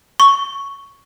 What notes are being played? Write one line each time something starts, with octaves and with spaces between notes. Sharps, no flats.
C#6